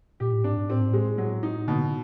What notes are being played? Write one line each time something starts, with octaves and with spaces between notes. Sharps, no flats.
A#2 G4
A2
G#2 D4
G#2
A2 C4
G#2
A2 G#3
F#3
D#4
B2 D3